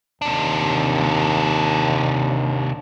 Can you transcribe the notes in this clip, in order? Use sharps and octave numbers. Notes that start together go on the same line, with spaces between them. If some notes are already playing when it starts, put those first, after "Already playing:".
D#2 C3 D4